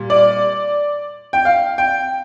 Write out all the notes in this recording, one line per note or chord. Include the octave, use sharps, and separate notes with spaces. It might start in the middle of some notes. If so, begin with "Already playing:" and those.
Already playing: A#2 G3
D5
G5
F5
G5